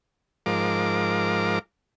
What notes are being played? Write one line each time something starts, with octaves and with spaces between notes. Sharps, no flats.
G#2 F3 A#4 D6